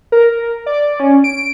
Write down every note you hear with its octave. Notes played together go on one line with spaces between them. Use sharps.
A#4
D5
C#4
D7